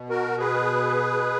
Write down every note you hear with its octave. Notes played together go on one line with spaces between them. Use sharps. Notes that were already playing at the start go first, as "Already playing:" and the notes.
Already playing: B2
F#4 A#4
G#4 B4